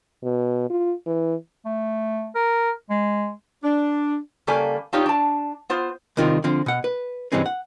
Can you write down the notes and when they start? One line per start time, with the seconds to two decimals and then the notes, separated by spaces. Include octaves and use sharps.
0.23 B2
0.70 F4
1.06 E3
1.65 A3
2.35 A#4
2.90 G#3
3.64 D4
4.47 C#3 G3 A#3 A4 D5 G#5
4.93 C4 D4 D#4 F4 G4 C#5
5.06 D4 A5
5.70 B3 F4 C5
6.17 C2 C3 D#3 F4 G4
6.44 D3 F3 C4
6.66 B2 F#5
6.84 B4
7.32 G2 C3 E3 G#3 C4 C#4
7.46 F#5